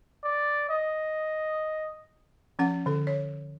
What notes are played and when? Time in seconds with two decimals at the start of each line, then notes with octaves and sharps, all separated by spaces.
0.24 D5
0.70 D#5
2.59 F3 C#4 F#5
2.86 D3 A4
3.07 C#5